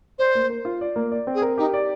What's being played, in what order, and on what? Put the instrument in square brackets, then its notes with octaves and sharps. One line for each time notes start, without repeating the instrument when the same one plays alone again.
[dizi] C5 [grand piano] D5
[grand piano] A#3
A#4
F4
D5
A#3
D5
C4
[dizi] G#4
[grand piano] A#4
[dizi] D#4 [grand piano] G4
[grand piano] D5